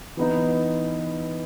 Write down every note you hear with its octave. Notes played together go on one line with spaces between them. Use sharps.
E3 B3 D#4